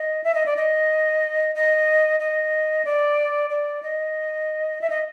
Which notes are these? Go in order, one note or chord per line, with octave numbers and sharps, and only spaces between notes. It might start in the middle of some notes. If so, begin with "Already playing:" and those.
Already playing: D#5
E5
D#5
D5
D#5
D#5
D#5
D5
D5
D#5
E5
D#5